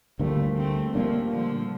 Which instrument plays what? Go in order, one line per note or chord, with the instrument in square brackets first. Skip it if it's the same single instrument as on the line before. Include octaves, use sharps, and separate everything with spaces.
[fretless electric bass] D2 D3 G3 A#3 [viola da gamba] F3 A3
[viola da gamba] A3 C4
[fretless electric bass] A#2 G3 A#3 D4 [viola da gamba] F3 A3
[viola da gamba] D3 F3